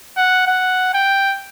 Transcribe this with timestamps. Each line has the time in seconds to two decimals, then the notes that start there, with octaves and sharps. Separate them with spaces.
0.17 F#5
0.47 F#5
0.94 G5